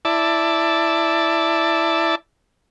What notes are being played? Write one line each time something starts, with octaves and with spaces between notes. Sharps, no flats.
E4 D5 A5